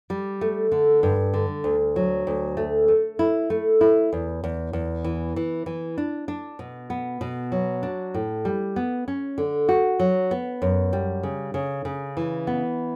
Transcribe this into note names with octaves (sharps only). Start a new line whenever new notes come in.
G3
A3
D3
G2
D3
D2
F#3
D2
A3
A3
E4
A3
E4
E2
E2
E2
E3
E3
E3
D4
D4
B2
B3
B2
F#3
D4
A2
G3
B3
C#4
D3
F#4
F#3
B3
F#2
G3
C#3
C#3
C#3
E3
B3